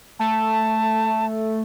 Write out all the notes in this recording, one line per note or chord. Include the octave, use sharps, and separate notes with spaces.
A3 A5